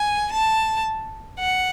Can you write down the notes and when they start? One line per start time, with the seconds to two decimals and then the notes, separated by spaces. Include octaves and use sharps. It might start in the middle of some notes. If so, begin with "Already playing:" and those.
Already playing: G#5
0.32 A5
1.39 F#5